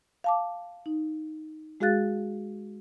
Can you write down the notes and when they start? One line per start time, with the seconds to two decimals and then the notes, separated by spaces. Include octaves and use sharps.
0.24 F5 A5 D6
0.86 D#4
1.80 G#3 F#4 G#4 F5 F#6 A6